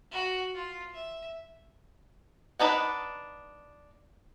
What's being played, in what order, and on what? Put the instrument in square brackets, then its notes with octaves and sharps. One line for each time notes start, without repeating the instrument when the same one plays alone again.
[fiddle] F#4
F4
E5
[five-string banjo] D4 D#4 B4 F#5